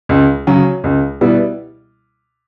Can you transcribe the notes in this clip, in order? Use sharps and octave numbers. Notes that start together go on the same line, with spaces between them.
C#2
C#3 F#3 C#4
C#2
B2 G3 B3 E4